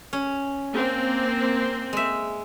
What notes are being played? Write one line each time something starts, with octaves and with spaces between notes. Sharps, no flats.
C#4
A#3 C4
G#3 E5